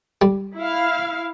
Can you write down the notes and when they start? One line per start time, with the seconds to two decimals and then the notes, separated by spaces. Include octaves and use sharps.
0.22 G3
0.57 E4 F5